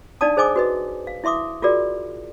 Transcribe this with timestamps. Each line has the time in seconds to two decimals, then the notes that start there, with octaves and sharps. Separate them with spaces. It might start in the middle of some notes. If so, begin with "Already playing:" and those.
0.21 D4 D#4 D5 F5 A5 D#6
0.37 G#4 C5 D#5 G#5 D6 D#6
0.56 F#4 B4 D#5
1.07 F5
1.24 E4 E5 C6 D6 D#6
1.62 F4 F#4 G#4 A#4 D5